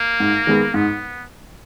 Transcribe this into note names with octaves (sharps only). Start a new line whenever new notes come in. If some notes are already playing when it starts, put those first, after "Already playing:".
Already playing: A#3
G#2
D#3 G#3 B3
G#2 B3